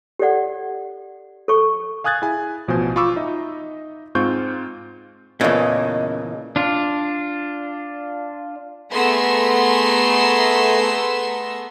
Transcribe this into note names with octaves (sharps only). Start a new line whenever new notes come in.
G4 A4 D5 F#5
A4 C#6
F5 G#5 D#6 F#6 G#6 A6
E4 G#4 G#5
A1 B2 F3 C5 G#5 G6
F4 B5 C#6 D6 E6
D#4 D#5 E5
G#2 C4 F4 C#6 G6
E2 A#2 C#3 E3 A3 C#4 D#5
D4 F4
A3 B3 G#4 A#5 C6 E6